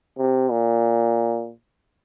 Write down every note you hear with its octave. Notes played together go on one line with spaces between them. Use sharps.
C3
A#2